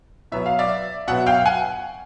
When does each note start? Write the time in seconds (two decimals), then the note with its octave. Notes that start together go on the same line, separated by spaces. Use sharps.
0.32 B2 F#3 B3 E5
0.46 F5
0.59 D5 E5
1.07 B2 F#3 B3 E5 F#5
1.26 F5 G5
1.46 F#5 G#5